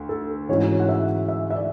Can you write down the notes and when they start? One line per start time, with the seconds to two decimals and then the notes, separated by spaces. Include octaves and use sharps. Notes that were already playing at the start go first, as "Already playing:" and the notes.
Already playing: D2
0.09 A4
0.49 G#2 E3 G#3 C#4 F#4 C#5
0.80 F#5
0.89 E5
1.29 E5
1.50 E5
1.55 D5